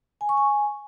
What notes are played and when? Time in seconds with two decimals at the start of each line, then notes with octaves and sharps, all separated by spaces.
0.21 G#5
0.29 C#6
0.37 G#5